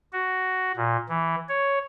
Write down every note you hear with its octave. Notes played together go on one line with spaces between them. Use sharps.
F#4
A#2
E3
C#5